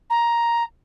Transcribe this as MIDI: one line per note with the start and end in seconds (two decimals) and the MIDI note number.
0.10 0.63 82